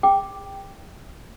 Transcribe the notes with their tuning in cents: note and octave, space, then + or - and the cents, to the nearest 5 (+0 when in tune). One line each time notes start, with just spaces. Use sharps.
G#4 -30 G5 +0 D6 +0